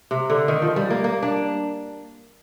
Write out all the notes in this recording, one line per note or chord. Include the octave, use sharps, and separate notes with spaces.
C3
D3
D#3
F3
G3
A#3
A#3
D4